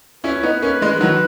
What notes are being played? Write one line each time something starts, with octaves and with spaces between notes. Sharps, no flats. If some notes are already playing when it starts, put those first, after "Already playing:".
C#4 E4 B4
C#4
B3 D#4
A#3 C#4
E3 G#3
D#3 F#3